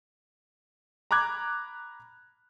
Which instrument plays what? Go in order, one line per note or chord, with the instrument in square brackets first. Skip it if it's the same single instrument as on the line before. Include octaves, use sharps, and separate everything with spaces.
[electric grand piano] A#5 B5 D6 F#6 G#6